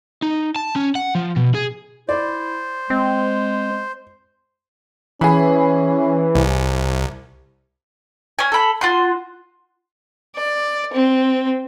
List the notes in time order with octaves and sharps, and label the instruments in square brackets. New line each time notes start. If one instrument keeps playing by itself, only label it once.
[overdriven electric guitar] D#4
A5
C#4
F#5
F3
B2
G#4
[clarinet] E4 [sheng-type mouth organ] C5 [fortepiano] D5
[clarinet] G#3 [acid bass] C4
[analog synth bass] E3 [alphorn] C#4 [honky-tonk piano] G#4 B5
[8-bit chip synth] C2 [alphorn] C5
[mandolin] C#4 G#5
A4 B5
F4 F#4 C6
[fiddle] D5
C4